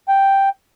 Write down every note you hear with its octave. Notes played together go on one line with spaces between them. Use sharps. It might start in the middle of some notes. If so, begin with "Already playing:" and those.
G5